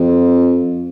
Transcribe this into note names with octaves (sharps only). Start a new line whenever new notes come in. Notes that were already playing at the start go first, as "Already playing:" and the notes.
Already playing: F2